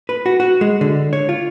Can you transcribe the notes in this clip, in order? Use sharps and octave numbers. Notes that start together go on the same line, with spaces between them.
B4
F#4
F#4
G#3
D3
C#5
F4